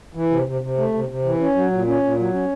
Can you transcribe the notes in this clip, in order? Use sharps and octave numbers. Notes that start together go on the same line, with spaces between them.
E3
C3
C3
C3
A3
C3
C3
E3
C#4
F#3
A#2
C#4
A#2
F#3
C#4